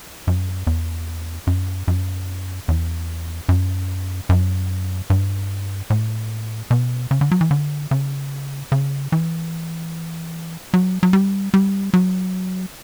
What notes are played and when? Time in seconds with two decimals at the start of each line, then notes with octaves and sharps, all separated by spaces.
0.27 F#2
0.67 E2
1.47 F#2
1.88 F#2
2.68 E2
3.49 F#2
4.29 F#2
5.10 G2
5.90 A2
6.71 B2
7.11 C#3
7.21 D3
7.31 F#3
7.41 E3
7.51 D3
7.91 C#3
8.72 C#3
9.12 E3
10.74 F#3
11.03 F#3
11.13 G3
11.54 G3
11.94 F#3